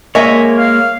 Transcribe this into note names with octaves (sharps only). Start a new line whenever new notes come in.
G#3 A#3 C#5 D#5 E5 G#5
F5